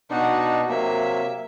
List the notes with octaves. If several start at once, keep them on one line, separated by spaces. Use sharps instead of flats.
B2 D4 D#4 F#4
C3 F#3 A#3 E5